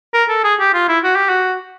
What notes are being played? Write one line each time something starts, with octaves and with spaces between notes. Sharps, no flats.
A#4
A4
G#4
G4
F4
E4
F#4
G4
F#4